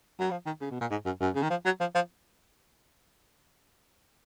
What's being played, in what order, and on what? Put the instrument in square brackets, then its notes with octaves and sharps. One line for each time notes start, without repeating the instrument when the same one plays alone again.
[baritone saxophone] F#3
F3
D#3
C#3
B2
A#2
G#2
F#2
F#2
C#3
D#3
F3
F#3
F3
F3